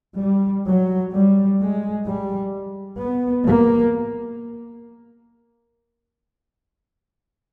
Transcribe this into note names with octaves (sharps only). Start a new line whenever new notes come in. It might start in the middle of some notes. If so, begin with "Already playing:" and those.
G3
F#3
G3
G#3
G3
B3
A#3